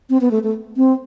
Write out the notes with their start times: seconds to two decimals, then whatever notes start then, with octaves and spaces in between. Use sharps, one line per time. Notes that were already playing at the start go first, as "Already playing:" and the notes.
0.09 C4
0.21 B3
0.31 A3
0.43 A3
0.77 C4